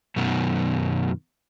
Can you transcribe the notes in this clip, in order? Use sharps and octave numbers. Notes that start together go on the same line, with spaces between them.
F#2 B2 D#3